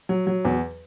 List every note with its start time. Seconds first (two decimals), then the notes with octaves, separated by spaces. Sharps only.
0.09 F#3
0.27 F#3
0.45 E2